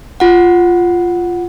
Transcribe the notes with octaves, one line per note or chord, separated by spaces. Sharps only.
F4 F#5